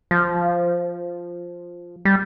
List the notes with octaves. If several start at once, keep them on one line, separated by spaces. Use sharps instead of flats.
F3
G3